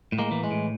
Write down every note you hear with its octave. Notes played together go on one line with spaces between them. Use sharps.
A2
G#3 A#3
E3
G#3
A2